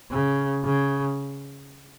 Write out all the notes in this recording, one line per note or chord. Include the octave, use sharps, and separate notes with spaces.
C#3
C#3